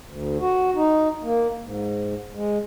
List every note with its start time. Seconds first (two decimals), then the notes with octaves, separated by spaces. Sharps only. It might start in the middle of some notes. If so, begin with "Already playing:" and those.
0.05 D2
0.40 F#4
0.75 D#4
1.23 A#3
1.62 G#2
2.34 G#3